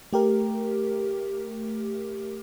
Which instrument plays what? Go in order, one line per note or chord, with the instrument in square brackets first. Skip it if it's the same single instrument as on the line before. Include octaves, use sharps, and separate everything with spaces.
[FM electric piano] A3 G4 A#4